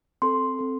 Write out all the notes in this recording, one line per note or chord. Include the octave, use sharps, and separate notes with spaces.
C4 A4 C6
C4 A4